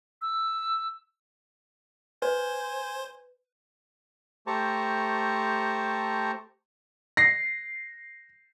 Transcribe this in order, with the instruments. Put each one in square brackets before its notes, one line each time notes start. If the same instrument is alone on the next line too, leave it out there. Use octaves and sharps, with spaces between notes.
[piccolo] E6
[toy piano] B4 [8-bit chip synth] C5 [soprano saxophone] G#5
[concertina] A3 G4 C5 A5 A#5 C#6
[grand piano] A#6 C7